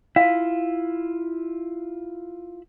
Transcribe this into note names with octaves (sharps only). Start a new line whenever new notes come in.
E4 F4 F5